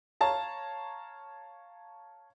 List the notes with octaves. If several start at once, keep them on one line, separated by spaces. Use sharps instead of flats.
C#5 F5 A5 A#5